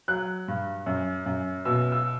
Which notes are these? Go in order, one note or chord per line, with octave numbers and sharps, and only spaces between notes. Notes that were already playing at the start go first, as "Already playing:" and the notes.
F#3 F#6
G2
F#2
F#2
B2 E6
E6